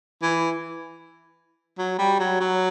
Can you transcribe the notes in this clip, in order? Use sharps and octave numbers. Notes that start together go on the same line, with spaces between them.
E3
F#3
G3
F#3
F#3